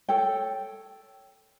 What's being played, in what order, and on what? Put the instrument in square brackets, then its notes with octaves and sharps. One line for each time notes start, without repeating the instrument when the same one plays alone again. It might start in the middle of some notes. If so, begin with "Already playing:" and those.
[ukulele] A4 C#5 G5